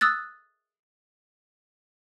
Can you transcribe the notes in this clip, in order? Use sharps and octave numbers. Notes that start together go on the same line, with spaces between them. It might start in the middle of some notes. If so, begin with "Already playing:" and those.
D#6 E6 F#6 A6